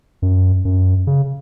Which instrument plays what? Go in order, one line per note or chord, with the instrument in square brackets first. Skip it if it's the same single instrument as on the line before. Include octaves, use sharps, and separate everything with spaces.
[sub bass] F#2
F#2
C#3